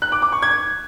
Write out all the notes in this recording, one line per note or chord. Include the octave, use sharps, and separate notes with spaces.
F#6
D6
D6
C#6
G#6